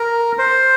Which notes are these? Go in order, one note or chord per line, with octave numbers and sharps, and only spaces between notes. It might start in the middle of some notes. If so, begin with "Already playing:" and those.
Already playing: A#4
C5